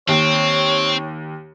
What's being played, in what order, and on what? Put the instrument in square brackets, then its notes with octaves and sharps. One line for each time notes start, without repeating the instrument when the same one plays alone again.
[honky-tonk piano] D#2 [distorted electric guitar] C4 [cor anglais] C#5